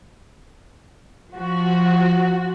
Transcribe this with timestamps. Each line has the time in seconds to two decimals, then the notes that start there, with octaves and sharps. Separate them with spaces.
1.33 F3 F#4